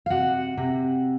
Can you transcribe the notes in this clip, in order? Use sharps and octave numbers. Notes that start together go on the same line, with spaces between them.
F5
C3 F#4 F#5
C3